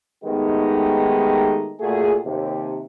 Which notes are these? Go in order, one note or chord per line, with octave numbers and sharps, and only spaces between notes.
D#3 G#3 A3 B3 D#4 G4
A#2 A3 F#4 G#4
D#2 C3